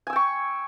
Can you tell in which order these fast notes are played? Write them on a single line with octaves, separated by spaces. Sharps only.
G#5 E6 G5 C#6